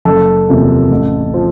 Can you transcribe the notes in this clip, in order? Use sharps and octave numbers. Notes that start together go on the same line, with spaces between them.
F#1 A4
E2 C3 F3 A#3
A1
F3